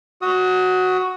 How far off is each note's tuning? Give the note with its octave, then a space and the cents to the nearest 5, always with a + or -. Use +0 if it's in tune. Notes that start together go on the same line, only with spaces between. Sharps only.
F#4 +0 D#6 +25